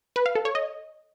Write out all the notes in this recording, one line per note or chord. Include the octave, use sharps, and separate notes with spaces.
B4
F5
A4
C#5
D#5